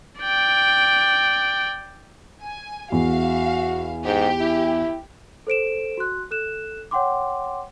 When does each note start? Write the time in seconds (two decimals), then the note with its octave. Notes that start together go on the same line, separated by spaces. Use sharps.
0.20 D5 G5
2.42 G#5
2.92 E2 F#4 E5 F5
4.05 G#2 G4
4.41 E4
5.47 A4 C5 D7 E7
5.98 F#4 C6 F#6
6.31 A4 F#6 E7
6.91 C#5 F#5 G5 C6 D6